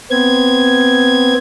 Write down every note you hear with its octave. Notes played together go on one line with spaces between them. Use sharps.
B3 C4 G#6